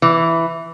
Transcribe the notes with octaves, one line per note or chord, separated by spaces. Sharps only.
E3